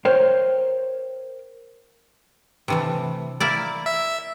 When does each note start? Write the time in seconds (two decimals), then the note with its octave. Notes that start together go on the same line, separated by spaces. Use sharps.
0.05 A#4 C5 C#5 G5
2.68 C3 E3 A3
3.40 A#3 E4 D5
3.86 E5